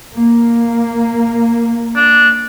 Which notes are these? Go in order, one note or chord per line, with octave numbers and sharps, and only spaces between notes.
A#3
D4